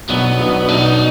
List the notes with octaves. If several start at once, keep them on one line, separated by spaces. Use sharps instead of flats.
B1 B2 F#3 B3 D4
B1 B2 F#3 D4
B1 B2 F#3 D4 D#4